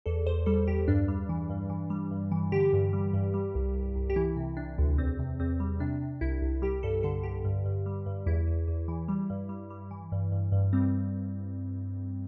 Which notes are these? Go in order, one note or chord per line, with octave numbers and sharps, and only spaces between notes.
E2 A4
E2 C5
G3 A4
E2 G4
G2 D4
G3
E3
G2
E3
G3
G2
E3
D3 G4
G2
G3
G2
G3
C2
C2
C2
G4
E3 E4
C3
C3 D4
D2
E2 C4
C3
E2 C4
G3
C3 D4
C3
C2 E4
C2
G3 G4
G2 A4
D3 A4
D3 G4
G2
G2
G3
G2
E2 E4
E2
E2
E3
G3
G2
G3
G3
E3
G2
G2
G2
G3 C4